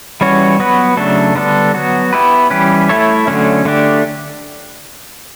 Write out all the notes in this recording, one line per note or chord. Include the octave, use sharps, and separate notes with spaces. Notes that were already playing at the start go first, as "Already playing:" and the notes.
E3 G3 C#4 F#4 C#5
F#3 B3 F#4 B4
C#3 F#3 A3 D4 A4
D3 G3 B3 D4 A4
F#3 B3 F#4
B3 E4 G4 B4
E3 G3 C#4 G4 B4
A3 E4 A4 C#5
D3 F#3 A3 C#4
D3 A3 D4 G4